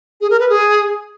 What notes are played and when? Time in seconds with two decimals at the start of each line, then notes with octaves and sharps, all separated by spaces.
0.21 G#4
0.30 A#4
0.40 B4
0.49 G#4